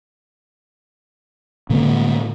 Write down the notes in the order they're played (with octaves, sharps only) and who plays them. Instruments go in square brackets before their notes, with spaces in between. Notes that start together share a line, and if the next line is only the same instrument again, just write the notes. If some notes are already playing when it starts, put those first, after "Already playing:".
[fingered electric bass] A2 D3 G#3 A#3